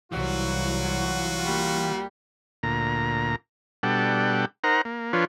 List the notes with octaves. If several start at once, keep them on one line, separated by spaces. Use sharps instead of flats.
C2 E3 F#3 F4 F#4
G3 A#3
D2 A#2 A#5
B2 G3 D4 A4 F#5 G5
D#4 A#4 C5 F#5 A#5
A#3
F3 D4 F4 B4 C#5